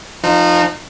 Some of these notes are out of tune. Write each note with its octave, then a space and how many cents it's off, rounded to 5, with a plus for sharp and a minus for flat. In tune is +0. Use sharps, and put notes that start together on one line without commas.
F3 +5 D#4 -25